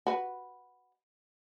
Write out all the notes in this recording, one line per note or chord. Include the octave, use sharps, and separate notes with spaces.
F#4 B4